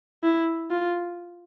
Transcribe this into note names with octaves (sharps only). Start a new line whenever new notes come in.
E4
F4